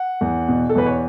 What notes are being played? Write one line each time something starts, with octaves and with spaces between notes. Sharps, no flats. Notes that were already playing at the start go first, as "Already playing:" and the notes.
Already playing: F#5
E2
B2
A4
E2 B4
C#5